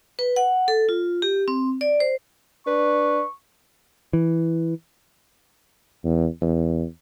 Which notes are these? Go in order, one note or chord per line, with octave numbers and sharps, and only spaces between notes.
B4
F#5
A4
F4
G4
C4
D5
C5
D4 B4 C#6
E3
E2
E2